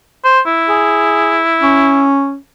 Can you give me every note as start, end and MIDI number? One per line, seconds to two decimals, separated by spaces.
0.24 0.40 72
0.46 2.12 64
0.69 1.42 68
1.62 2.36 61